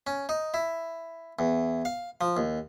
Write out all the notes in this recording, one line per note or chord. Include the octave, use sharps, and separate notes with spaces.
C#4
D#4
E4
E2
F5
F3
D#2